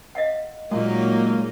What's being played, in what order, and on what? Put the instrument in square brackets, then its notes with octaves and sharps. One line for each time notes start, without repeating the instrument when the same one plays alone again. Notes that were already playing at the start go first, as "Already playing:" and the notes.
[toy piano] D#5 F5 F#5
[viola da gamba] A#2 D#4 [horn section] F#3 A#3 [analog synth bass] G#3